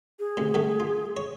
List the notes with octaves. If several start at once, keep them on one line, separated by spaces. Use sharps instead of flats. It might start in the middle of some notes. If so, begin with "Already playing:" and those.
G#4
D2 C3
D3 G3 A3
F4
C#5